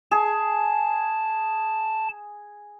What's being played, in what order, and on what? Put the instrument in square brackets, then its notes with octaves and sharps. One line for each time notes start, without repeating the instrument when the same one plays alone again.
[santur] G#4 [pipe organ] A5